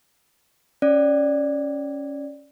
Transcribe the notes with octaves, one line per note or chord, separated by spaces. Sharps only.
C#4 D5